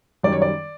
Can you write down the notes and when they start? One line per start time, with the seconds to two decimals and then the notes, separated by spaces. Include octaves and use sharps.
0.23 F#2 D#3 G3 D5
0.32 C#5
0.42 D5